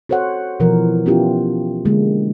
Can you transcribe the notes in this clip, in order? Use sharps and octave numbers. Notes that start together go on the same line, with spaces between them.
F#4 A4 C5 C#5 F#5
B2 E3 F3 A#4
B3 C#4 E4 F4 G4
D3 G#3 A#3